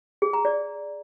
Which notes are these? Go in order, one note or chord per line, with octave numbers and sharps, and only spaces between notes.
G#4
A#5
D5